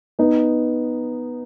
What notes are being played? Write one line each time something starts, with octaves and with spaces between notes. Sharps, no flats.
B3 D#4